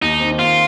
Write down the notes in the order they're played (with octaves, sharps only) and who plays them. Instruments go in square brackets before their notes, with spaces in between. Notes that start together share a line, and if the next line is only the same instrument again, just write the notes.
[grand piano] D#2 [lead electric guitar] D#4
[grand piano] D#3 C4
[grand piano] D#2 [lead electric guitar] F4